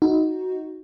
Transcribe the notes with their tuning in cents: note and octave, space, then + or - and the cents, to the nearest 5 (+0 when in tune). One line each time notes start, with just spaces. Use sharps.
D#4 +15 F#4 +0